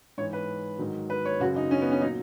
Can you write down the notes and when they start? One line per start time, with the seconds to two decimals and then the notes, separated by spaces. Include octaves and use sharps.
0.17 G#2 E3 C#5
0.33 B4
0.78 G#2 D#3 F#3
1.10 B4
1.25 C#5
1.40 F#2 C#3 F#3 F#4
1.56 D#4
1.71 C#4
1.82 B3
1.92 C#4
2.01 A#2 F#3 D#4